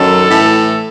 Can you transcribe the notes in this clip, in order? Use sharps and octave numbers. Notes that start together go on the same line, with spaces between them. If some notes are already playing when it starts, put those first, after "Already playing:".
Already playing: F#2 D#3 F#3 A4
A2 E3